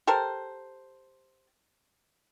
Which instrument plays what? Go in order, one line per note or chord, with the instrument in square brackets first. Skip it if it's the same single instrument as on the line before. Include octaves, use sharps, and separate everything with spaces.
[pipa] G4 A4 A#4 C5